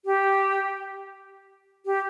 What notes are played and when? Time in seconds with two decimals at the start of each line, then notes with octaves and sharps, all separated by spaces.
0.05 G4
1.86 G4